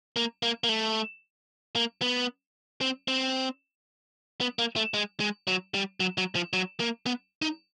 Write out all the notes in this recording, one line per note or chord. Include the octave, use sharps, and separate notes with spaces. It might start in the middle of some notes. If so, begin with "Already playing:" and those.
A#3
A#3
A#3
A3
A#3
B3
C4
C4
B3
A#3
A3
G#3
G#3
F#3
G3
F#3
F#3
F3
F#3
A#3
B3
D#4